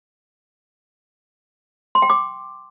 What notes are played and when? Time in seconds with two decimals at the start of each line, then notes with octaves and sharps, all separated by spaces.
1.95 C6
2.02 G5
2.10 D6